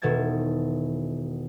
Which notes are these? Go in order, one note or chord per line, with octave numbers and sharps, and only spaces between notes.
E1 B2 D#3 A4 G#6 A6